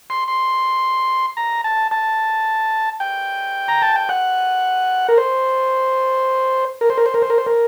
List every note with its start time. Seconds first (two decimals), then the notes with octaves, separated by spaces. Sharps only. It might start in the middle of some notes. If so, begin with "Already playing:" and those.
0.10 C6
0.28 C6
1.37 A#5
1.64 A5
1.91 A5
3.00 G5
3.68 A#5
3.82 A5
3.96 G5
4.09 F#5
5.09 A#4
5.18 C5
6.81 A#4
6.90 C5
6.98 A#4
7.06 C5
7.14 A#4
7.22 C5
7.30 A#4
7.38 C5
7.47 A#4